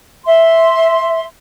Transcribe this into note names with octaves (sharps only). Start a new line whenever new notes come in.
E5 C6